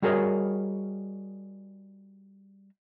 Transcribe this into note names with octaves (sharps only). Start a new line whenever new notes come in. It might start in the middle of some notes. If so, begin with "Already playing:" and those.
G3 F#4 G#4 A#4 C#5 D#5